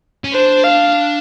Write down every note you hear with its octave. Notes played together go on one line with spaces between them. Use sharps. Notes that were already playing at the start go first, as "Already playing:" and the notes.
C#4
D4 C5
F5